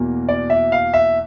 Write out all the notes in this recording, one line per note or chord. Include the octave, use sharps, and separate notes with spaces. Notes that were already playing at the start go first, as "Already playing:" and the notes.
Already playing: E2 B2 F#3 A#3
D5
E5
F5
E5